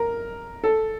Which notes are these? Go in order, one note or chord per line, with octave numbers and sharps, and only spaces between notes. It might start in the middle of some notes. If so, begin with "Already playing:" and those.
Already playing: A#4
A4